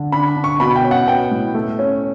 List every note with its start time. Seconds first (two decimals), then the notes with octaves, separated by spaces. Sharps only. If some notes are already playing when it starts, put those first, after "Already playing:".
Already playing: D3
0.12 D4 B5
0.36 D4
0.44 C#6
0.60 B2 B5
0.76 G5
0.84 C#4
0.91 F#5
1.08 B3 G5
1.31 A2
1.54 A3
1.79 C#4